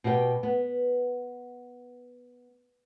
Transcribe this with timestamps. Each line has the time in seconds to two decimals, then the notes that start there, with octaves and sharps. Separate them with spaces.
0.04 B2 F#4 G4 E5 G5
0.43 B3